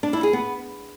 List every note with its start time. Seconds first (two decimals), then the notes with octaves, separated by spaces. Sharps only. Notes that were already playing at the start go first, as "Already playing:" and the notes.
0.03 D4
0.13 E4
0.23 G#4
0.33 B3